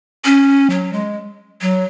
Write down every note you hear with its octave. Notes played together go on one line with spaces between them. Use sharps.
C#4
F#3
G#3
F#3